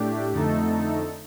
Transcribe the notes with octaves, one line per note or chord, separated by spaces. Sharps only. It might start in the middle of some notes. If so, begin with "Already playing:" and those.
Already playing: A2 A3 D4 G4
F2 D3 A3 D#4 A4